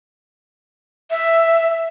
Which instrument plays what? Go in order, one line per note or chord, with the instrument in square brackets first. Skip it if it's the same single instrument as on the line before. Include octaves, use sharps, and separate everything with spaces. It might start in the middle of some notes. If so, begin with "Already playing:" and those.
[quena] E5